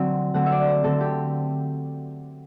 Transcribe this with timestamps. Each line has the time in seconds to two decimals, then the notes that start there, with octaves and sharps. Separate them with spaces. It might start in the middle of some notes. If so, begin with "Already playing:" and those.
Already playing: D3 F#3 C4
0.34 D3 A3 C4 F#5
0.46 E5
0.51 D5
0.67 C5
0.84 D3 A3 C4 A4
1.00 G4